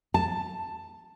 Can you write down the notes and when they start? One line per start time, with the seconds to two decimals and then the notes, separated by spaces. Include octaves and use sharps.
0.14 A5